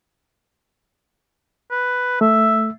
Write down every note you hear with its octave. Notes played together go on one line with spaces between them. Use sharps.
B4
A3 E5